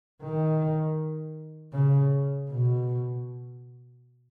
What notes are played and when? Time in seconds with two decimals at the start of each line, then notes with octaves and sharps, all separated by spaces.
0.22 D#3
1.73 C#3
2.50 B2